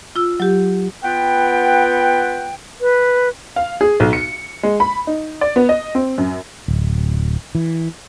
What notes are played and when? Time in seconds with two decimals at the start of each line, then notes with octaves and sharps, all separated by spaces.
0.16 F4 E6
0.40 F#3 G4
1.03 B3 F4 B4 F#5 G5
2.81 B4
3.56 F5
3.81 G#4
4.00 B1
4.13 C#7
4.63 G#3
4.80 B5
5.07 D#4
5.41 D5
5.56 B3
5.69 D#5
5.95 C4
6.18 F#2
6.68 D1
7.55 E3